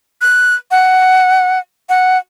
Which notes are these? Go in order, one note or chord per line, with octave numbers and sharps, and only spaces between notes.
F#6
F#5
F#5